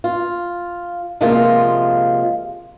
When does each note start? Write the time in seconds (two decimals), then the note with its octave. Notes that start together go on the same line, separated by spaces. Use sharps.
0.04 F4
1.21 C3 F3 G#3 A#3 F4